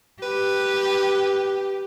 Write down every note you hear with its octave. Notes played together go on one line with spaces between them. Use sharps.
G4 B4